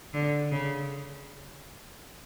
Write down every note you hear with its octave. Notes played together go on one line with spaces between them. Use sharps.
D3
C#3